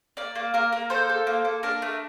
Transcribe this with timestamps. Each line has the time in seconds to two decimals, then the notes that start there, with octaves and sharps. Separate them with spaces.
0.17 A#3 D5
0.35 A#3
0.54 A#3 A#4
0.72 A#3
0.90 A4 C5
1.09 A4
1.27 A#3
1.45 A#3
1.63 D4 A#4
1.82 A3